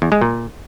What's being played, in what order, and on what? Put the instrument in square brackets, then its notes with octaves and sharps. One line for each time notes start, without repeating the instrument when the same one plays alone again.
[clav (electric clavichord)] E2
G#3
A#2